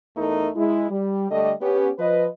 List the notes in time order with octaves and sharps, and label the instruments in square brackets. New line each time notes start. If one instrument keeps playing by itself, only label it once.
[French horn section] E2 A3 D#4 E4 A4 A#4
G#3 E4
G3
D3 G3 A3 D5 D#5
B3 C#4 G4
F3 B4 D#5